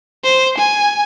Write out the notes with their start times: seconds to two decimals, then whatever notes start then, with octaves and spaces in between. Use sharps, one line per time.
0.24 C5
0.58 G#5